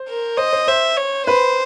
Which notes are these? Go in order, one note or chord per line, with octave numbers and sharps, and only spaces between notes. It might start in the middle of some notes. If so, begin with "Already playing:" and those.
Already playing: C5
A#4
C5 D#5
C5
C5 E5
C#5
B4 C5